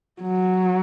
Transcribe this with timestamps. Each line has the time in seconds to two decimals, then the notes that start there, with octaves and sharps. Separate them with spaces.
0.21 F#3